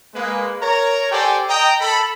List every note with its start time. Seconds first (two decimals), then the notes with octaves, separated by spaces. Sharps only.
0.14 G#3 A#3 B4
0.61 A#4 C#5 A#5
1.11 G4 A4 C5 D5 G5 G#5
1.48 D#5 G5 A#5
1.80 A4 B5